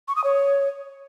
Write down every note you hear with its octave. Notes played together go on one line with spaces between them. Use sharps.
C#6
D#6
C#5